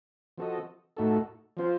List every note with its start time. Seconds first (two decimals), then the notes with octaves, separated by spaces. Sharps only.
0.38 F3 C4 F#4 A4 D#5
0.97 A2 A3 D#4 F#4 A4
1.57 F3 C4 F4 C5